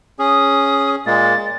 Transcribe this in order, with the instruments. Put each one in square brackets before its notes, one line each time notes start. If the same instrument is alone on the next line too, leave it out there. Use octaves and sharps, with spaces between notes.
[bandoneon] C#4 G#4 [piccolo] D#6
[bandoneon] A#2 G#3 A#3 [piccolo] A6
[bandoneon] G#3